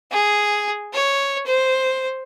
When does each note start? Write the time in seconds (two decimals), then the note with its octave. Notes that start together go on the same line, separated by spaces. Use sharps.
0.11 G#4
0.94 C#5
1.46 C5